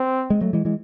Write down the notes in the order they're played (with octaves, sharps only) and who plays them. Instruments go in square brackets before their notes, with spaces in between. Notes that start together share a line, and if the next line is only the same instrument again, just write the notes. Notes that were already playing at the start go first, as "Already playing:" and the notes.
Already playing: [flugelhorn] C4
[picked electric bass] G#3
F#3 A3
E3 G#3
E3 G#3